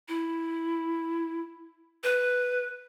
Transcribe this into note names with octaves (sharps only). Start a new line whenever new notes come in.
E4
B4